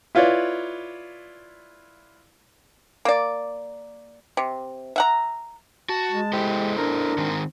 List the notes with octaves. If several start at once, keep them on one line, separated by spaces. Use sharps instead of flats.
E4 F4 B4 C#5 D5
A#3 D5
C3
E5 F#5 A#5
F#4 A5
G#3
E4 G4 A4 C5
D4 A#4
D#3 G#3 C4